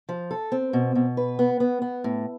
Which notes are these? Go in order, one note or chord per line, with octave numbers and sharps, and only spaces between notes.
F3
A4
C4
B2
B2
B4
B3
B3
B3
A2